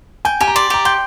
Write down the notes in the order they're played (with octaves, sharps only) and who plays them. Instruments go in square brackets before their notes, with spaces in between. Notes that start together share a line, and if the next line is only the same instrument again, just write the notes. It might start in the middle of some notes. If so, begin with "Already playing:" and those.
[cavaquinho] G5 [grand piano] G#5
[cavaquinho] G4 [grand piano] G#5
[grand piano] A#5
[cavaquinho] D5 [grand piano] C6
[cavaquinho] G4 [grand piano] A#5
[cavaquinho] G5 [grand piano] C6